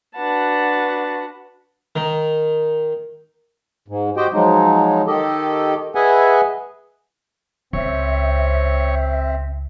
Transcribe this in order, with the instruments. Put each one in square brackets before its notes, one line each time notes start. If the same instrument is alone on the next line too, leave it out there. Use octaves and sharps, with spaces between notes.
[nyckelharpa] D4 A5 [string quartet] F#4 B4 F#5
[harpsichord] D#3
[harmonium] G#2
F#4 G4 C5 D#5 G5
F3 F#3 G#3 D#4
D#3 G4 A4 D#5
G#4 B4 D#5 E5 F#5 G#5
[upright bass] C#2 [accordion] C4 [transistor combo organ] C#5 [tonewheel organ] E5